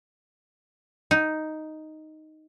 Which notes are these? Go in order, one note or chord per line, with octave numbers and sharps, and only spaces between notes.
D#4